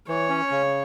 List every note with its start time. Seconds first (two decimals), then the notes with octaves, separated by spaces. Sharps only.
0.08 E3 C#5
0.29 C#4
0.51 C#3